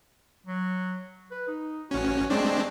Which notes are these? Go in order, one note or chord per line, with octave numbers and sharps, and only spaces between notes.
F#3
B4
D#4
A1 C#4 F#4
G#3 A3 C4 D4